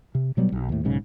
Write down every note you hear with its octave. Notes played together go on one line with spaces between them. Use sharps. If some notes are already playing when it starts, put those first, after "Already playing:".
C3
B2 F#3 G3 B3
B1
D#2 A2
B1 G#2 C#3